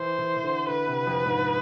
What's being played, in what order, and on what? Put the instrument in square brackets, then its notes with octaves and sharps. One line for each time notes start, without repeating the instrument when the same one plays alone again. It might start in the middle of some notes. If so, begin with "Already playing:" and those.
Already playing: [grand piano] E3 [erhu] C5
[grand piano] E3
E3
D3
[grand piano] D3 [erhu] B4
[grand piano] C3
F2
G#2